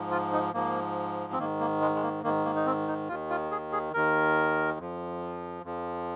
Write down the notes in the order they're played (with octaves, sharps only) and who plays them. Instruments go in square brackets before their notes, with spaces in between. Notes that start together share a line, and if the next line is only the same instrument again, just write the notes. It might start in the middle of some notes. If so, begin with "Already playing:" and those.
Already playing: [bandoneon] G#2 F3
F4
D#4
G#2 F3 A#3
C4
G#2 D#3 A#3
A#3
G#3
G#3
A#3
G#2 D#3 A#3
A#3
D#4
C4
D#4
D#2 D#3 F4
F4
G#4
G#4
D#2 D#3 A#4
F2 F3
F2 F3